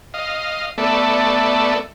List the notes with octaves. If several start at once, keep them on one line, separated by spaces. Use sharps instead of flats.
D#5 F5
A3 B3 A4 D5 E5